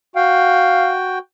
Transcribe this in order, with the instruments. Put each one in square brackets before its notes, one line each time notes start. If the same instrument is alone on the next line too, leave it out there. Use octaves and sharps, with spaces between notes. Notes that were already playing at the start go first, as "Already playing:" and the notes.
[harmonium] F#4 G5 [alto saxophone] F5